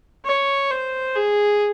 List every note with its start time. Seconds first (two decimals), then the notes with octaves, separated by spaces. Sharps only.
0.25 C#5
0.70 C5
1.15 G#4